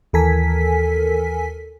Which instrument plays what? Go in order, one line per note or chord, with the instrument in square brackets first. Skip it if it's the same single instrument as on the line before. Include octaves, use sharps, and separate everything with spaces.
[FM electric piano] D#2 E3 A4 A#4 G#5 B6